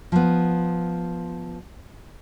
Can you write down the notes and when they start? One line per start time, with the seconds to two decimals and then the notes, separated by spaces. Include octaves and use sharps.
0.12 F3 B3